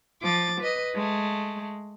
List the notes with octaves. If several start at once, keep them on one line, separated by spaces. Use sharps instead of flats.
F3 D6 A6
B4 D#5
G#3 A3